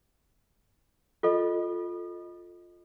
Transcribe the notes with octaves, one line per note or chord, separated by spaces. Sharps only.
F4 A4 D#5